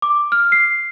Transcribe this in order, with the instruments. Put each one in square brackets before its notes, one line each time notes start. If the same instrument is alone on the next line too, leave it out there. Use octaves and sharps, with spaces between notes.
[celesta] D6
F6
C7